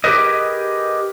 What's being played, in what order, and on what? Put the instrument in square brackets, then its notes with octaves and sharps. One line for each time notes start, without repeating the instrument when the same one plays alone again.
[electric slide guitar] G4 G#4 A#4 B4 D#5